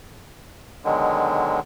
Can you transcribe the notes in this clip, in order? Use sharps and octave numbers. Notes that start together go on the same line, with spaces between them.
B2 D3 D#3 F#3 G#3